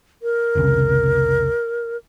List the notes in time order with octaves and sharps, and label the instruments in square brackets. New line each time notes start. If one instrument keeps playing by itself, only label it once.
[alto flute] A#4
[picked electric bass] F1 C2 C#3